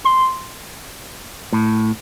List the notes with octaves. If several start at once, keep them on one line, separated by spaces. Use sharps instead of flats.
C6
A2